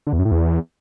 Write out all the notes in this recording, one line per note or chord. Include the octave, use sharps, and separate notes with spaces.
D3
E2
F#2
A2
E2